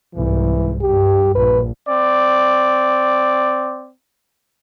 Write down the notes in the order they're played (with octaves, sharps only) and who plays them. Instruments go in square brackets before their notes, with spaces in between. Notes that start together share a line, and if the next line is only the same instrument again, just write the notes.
[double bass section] C2 G#2 [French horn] E3
[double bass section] G2 [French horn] G4
[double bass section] A#1 [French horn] B4
[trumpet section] C4 D5